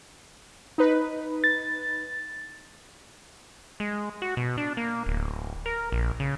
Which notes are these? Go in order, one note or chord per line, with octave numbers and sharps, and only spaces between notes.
D#4 B4
A6
G#3
F#4
B2
D4
A#3
D1
A#4
A#1
C#3